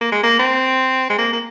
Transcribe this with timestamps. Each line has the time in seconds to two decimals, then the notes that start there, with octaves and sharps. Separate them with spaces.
0.01 A#3
0.12 G#3
0.24 A#3
0.39 C4
1.10 G#3
1.18 A#3
1.33 A#3